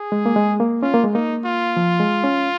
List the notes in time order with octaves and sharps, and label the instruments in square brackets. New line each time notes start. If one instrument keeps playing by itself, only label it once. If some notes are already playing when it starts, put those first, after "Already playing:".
Already playing: [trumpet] G#4
[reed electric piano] G#3
A#3
G#3
A#3
[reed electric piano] C#4 [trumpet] F4
[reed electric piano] A#3
G#3
[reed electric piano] A#3 [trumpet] D#4
[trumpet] F4
[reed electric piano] F3
G#3
C#4